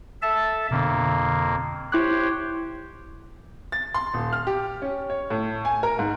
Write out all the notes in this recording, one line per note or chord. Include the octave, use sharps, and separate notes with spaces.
A4 E5 A5
F2 B2 D3 A#3
E4 G4 C5 C#5 F#6
A6
C6
D#1
F6
G4
C#4
C#5
A2
G#5
A#4
G#2